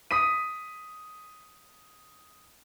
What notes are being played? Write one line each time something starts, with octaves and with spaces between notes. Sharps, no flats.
D#6 B6 D#7